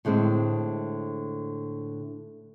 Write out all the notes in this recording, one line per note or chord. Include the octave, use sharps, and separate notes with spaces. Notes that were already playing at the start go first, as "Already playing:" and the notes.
A2 D3 G#3 C4